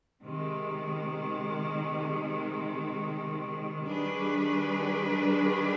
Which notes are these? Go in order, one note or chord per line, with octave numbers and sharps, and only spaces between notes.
C3 D#3 G#3
D#3 G3 D4 G#4 B4